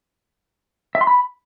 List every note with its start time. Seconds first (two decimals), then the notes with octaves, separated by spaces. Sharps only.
0.95 E5
1.01 C6
1.07 B5